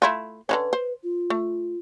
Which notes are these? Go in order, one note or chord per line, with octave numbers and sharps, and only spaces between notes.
A3 E4 F4
D3 E3 C#4 B4
C5
F4
A3